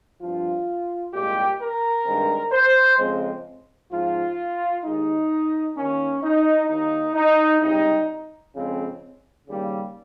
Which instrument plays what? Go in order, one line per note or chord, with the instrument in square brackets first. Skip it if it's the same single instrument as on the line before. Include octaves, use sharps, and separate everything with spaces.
[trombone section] G2 F3 C4 F4
C2 A#2 G#3 G4
A#4
G2 D#3 G#3 C4
C5
F2 C#3 G#3 C4
G#2 F3 C4 F4
D#2 D#3 G#3 D#4
D#2 D#3 A#3 C#4
D#4
D#2 D#3 A#3 D#4
D#4
C#2 C3 G3 D#4
F2 C#3 G#3 C4
D#2 C#3 G3 A#3